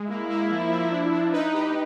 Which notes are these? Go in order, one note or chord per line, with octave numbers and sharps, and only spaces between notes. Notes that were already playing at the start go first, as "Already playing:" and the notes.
Already playing: G#3
A#3 E4
A#3
F3
F3
D4
D4
D#4 B4
G4